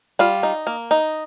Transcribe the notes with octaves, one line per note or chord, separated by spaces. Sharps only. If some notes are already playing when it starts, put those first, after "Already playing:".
G3 F4
D#4
A#3
D#4